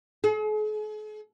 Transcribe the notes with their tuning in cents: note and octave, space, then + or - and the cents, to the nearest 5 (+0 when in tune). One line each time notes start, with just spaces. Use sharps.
G#4 +45